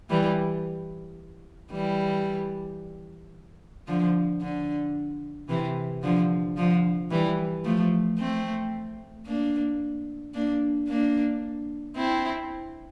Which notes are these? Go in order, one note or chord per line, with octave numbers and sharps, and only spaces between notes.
E3 G3
E3 G3
D3 F3
D3
C3 E3
D3 F3
D3 F3
E3 G3
F3 A3
A3 C4
A#3 D4
A#3 D4
A#3 D4
C4 E4